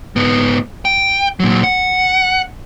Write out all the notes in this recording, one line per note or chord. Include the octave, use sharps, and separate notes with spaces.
G#2 B3
G5
A#2 F#3
F#5